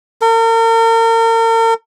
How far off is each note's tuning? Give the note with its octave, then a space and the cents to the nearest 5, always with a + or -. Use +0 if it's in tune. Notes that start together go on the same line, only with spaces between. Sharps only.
A#4 -40